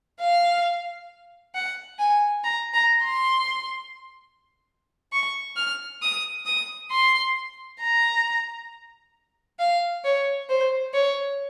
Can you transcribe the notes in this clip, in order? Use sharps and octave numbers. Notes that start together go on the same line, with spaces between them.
F5
F#5
G#5
A#5
A#5
C6
C#6
F6
D#6
D#6
C6
A#5
F5
C#5
C5
C#5